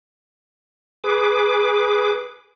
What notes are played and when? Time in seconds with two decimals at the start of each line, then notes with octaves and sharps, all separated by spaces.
1.04 G#4 B4 D6